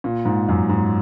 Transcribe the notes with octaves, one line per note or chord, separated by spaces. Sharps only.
A#2
G#2
F#2
G#2